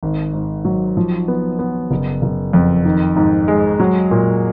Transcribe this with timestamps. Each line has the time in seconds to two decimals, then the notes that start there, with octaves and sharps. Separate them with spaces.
0.03 G#1
0.33 G#2
0.65 F#3
0.97 F3
1.28 B3
1.59 B3
1.91 F#1
2.22 F#1
2.53 F2
2.85 D#3
3.16 G#2
3.48 G#3
3.80 F#3
4.11 A#2